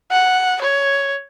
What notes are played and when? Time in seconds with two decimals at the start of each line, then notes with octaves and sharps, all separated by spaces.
0.12 F#5
0.62 C#5